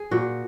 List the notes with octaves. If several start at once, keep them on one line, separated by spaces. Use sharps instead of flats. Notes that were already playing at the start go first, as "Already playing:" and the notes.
Already playing: G#4
A#2 F#4